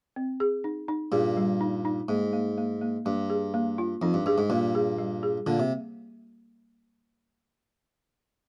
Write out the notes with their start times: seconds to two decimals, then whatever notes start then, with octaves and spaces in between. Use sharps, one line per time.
0.16 C4
0.40 G#4
0.64 D#4
0.88 D#4
1.12 G2 A#2 G#4
1.37 G3
1.61 D#4
1.85 D#4
2.09 G#2 A#3
2.33 A#3
2.58 A#3
2.81 A#3
3.05 G2 A#3
3.30 G#4
3.54 A#3
3.78 F4
4.02 F2 D#4
4.14 G2
4.26 G2 G#4
4.38 G#2
4.50 G2 A#2 A#3
4.75 G#4
4.98 G3
5.23 G#4
5.47 A#2 D3 A#3
5.60 C3